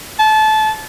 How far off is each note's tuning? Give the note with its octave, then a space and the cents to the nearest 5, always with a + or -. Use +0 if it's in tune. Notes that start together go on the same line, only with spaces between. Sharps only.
A5 -25